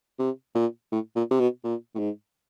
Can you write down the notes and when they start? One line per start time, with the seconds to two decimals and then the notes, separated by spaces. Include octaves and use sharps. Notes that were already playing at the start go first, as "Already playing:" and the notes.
0.19 C3
0.55 A#2
0.92 A2
1.16 A#2
1.31 C3
1.40 B2
1.64 A#2
1.95 A2
1.99 G#2